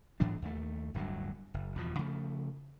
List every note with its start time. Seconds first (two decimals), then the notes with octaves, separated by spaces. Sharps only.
0.20 G#2 E3 F#3 D4
0.42 D#2 A3
0.94 D1 G2 D3 F#3
1.54 F#1
1.76 E2 B2 F3
1.99 C#3 F3 A3